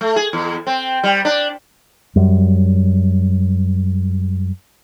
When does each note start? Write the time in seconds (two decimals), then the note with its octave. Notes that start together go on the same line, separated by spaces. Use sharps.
0.01 A3
0.16 G#4
0.33 E2
0.67 C4
1.03 G3
1.25 D4
2.16 F#2 G3